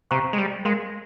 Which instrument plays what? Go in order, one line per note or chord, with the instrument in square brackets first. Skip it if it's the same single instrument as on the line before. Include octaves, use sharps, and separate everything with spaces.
[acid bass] C3 [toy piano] C5 F5 A#5 C#6
[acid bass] G#3
G3
[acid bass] G#3 [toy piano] A#4 F5 C6